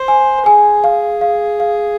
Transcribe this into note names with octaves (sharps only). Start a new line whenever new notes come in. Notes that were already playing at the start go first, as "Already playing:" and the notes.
Already playing: C5
G#5
G#4 G#5
F5
F5
F5